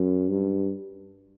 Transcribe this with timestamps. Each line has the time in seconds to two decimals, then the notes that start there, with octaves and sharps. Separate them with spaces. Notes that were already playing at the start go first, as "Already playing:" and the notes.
Already playing: F#2
0.29 G2